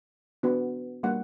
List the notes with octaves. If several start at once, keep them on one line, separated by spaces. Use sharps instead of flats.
B3 D4 F#4
G3 A#3 D4 F#5